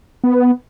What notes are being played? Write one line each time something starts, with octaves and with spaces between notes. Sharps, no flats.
B3